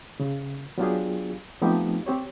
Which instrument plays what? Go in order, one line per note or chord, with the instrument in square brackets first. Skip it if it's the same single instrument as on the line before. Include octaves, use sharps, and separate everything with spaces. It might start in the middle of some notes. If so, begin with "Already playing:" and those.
[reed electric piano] C#3
F#3 B3 D4 F4 G4 G#4
F3 A3 B3 C4 D#4 G4
C4 G4 C#5